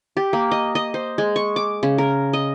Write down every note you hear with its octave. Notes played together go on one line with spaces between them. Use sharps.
G4
A#3
D#5
D#5
C5
G#3
C#6
D6
C#3
A#4
D#5